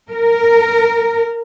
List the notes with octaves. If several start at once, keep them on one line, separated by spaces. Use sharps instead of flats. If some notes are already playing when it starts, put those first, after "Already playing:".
A#4